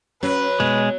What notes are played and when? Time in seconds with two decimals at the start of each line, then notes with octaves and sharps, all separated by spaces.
0.23 F#3 C#4 B4
0.60 B2 G#3